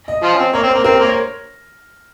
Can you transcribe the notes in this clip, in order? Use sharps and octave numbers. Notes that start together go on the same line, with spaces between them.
D#5
F3 F4
C#4
C4
A#3 C#5
C4
C5
A#3
C4 A#4
C5
A#3
C#5